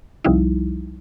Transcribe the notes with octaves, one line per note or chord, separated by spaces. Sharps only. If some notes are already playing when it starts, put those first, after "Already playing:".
C2 F3 G3 D#4 E4